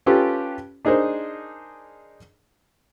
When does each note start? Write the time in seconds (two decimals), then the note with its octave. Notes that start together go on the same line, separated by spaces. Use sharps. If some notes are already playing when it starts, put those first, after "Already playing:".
0.06 C#4 F4 G4 A4 B4
0.85 D4 D#4 G#4 A#4 C5